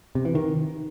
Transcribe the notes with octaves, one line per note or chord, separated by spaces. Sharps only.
C3
E3
D#3